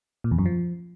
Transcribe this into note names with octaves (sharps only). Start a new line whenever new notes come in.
A#2
E2
F#2
F3